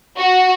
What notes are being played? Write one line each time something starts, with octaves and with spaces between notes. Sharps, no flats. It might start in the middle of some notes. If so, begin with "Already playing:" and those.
F#4